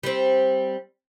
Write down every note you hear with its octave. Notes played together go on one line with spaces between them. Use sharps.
G3 C4